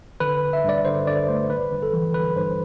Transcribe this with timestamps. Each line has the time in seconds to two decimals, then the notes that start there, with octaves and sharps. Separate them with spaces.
0.20 D3 B4
0.42 G1
0.53 E5
0.64 G2 D5
0.85 D3 C5
1.07 D3 D5
1.28 A3 C5
1.50 G1 B4
1.71 G1
1.83 A4
1.93 E3
2.14 G1 B4
2.36 G2 C5